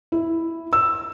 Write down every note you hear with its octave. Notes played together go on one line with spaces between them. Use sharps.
E4
E6